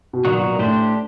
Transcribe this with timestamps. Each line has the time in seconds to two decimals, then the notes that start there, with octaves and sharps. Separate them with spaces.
0.13 B2
0.25 A#2 D#3 F#3 B3 D#4 F#4
0.41 A#2
0.59 A2 D4 G4 C5